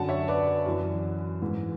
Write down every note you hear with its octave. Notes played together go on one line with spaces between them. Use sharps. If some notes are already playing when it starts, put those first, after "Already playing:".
Already playing: F#2 D3 F#3 F#5 A5
C#5 E5
B4 D5
B4
F#2 E3
G#2 E3